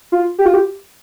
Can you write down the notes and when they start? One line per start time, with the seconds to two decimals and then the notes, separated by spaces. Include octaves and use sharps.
0.12 F4
0.39 G4
0.46 F4
0.54 G4